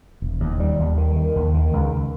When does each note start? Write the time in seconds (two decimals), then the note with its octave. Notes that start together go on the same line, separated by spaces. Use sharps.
0.22 E1
0.40 D#2
0.60 G3
0.79 D#2
0.98 D#3
1.16 D#3
1.36 D#2
1.54 D#3
1.73 C#2